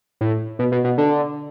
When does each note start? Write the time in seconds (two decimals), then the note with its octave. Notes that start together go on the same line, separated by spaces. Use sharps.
0.21 A2
0.59 B2
0.72 B2
0.84 B2
0.98 D3